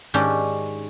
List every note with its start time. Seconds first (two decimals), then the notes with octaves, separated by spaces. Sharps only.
0.14 G#2 D#3 C#4 D4 G4